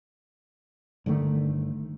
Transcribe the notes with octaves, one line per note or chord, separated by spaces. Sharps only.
G1 D3 D#3 A3